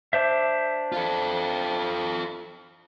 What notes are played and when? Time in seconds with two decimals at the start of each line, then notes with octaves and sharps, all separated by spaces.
0.13 D4 C5 E5
0.92 F4 A4